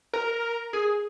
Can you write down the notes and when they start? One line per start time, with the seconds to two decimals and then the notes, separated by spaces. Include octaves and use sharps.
0.13 A#4
0.73 G#4